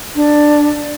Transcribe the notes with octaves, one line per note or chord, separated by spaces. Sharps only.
D4